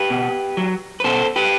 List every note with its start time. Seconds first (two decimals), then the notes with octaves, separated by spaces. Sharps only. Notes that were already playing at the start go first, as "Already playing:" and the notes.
Already playing: G4 B4
0.10 B2
0.57 F#3
1.00 B4
1.04 B2 A4 C5
1.36 G4 B4